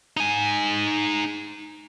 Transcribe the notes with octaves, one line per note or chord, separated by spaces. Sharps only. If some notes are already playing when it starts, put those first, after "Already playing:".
D#4 G#5